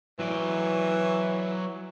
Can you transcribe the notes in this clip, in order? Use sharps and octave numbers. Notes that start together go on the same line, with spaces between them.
E3 F#3 D5